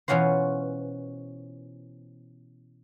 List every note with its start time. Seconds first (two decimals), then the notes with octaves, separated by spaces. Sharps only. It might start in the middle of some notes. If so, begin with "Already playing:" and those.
0.08 B2 E3 C#4 F4 F#4 C5